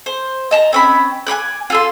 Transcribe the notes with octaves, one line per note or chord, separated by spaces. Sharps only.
C5
D#5 A5 A#5
C4 C#4 B5
G#5 B5 D6 F#6
F4 A4 C6